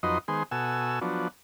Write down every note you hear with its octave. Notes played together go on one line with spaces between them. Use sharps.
F2 F#3 D#4 B4 D#5 C6
D#3 G#3 B3 G#4 C5 C6
B2 F#4 A4 G#5 E6
F3 F#3 B3 D4